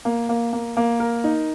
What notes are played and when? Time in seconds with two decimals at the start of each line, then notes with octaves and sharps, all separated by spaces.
0.05 A#3
0.29 A#3
0.53 A#3
0.77 A#3
1.00 A#4
1.24 D#4